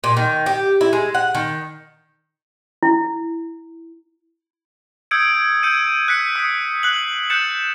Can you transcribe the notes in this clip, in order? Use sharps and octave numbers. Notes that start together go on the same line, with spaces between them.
A#2
D#3
G4
E4
G#3
F#5
D#3
E4
D#6 E6 G6 G#6 C#7 D7
E6 G6 G#6 C#7 D#7
F#6 B6 C#7
D#6 C#7
F#6 C7 F#7
F#6 G6 A6 C#7 E7